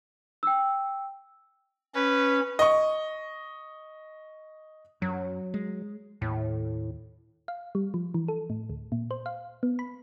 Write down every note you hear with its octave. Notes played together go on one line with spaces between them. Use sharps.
G5 E6
C#4 B4
D#5 C#6
F#2 F#3
G#3
D#2 A2
F5
G3
F3
E3
A4
A2
D2
A#2
C5
F5
B3
B5